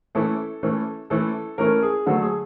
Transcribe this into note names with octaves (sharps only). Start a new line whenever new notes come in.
E3 A3 C#4 E4 A4
E3 A3 C#4 E4
E3 A3 C#4 E4 A4
E3 A3 C#4 E4 A#4
G#4
D3 F#3 A3 A4
G#4